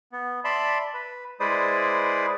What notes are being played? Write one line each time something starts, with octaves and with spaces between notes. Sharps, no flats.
B3
D5 E5 A5 B5 C6
B4
G#3 E4 B4 C5 D5 D#6